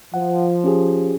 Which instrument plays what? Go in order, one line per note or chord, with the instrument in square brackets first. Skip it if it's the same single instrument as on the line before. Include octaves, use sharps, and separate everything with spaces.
[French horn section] F3 [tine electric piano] F#5
[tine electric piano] C#4 G4 G#4